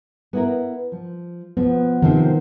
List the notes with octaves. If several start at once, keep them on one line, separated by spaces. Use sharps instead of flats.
B3 E4 A#4
F3
F3 B3
C3 D#3 F3 C4